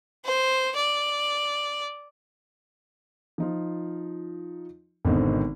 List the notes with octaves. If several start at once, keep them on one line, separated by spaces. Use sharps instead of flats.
C5
D5
F3 D#4 F4
G#1 B2 D3 C4 D#4